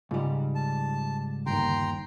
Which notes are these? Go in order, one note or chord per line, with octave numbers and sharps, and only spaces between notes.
G#2 C#3 G3 F4
A5
G1 D#2 G5 A#5 C6